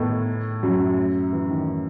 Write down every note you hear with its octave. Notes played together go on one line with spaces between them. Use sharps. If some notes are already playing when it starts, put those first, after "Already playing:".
Already playing: A2 D#3 A3 B3 D#4
F#2 F#3
E3
D#3